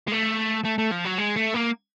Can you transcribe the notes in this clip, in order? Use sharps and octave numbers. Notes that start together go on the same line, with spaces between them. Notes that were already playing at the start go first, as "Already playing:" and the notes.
G#3
A3
A3
A3
F3
F#3
G#3
A3
A#3